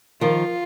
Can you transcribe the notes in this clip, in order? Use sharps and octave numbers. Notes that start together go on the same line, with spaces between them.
D#3 F3 F4